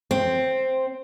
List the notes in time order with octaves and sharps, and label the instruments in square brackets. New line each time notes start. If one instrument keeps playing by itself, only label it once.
[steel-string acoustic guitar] C4